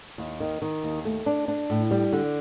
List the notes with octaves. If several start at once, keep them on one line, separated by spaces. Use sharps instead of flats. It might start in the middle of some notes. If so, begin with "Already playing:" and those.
D#2
D#3
D#3
D#2
A3
D4
D4
A2
G3
D3